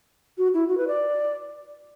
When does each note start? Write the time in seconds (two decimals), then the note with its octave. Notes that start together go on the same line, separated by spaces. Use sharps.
0.38 F#4
0.54 E4
0.68 F#4
0.78 B4
0.88 D5